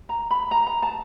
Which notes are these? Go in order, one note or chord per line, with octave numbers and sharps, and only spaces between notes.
A#5
B5
A#5
A#5
A5